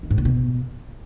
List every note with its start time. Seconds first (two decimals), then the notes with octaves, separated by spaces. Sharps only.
0.03 D#3
0.10 G#2
0.18 A#2
0.25 B2